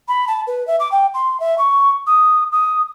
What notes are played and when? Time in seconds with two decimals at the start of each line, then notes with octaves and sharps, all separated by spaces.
0.08 B5
0.27 A5
0.47 B4
0.67 E5
0.79 D6
0.91 G5
1.14 C6
1.40 E5
1.58 C#6
2.06 D#6
2.52 D#6